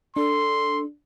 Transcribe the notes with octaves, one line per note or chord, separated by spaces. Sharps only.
D4 A4 C6